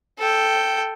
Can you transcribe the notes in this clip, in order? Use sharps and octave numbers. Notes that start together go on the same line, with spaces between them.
A4 G5